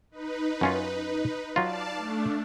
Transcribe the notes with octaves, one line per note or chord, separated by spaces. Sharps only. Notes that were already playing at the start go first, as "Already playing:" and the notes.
D#4 B4
F#2 C#4 F4
F#3 F4 D5 F5 A5
A3 D4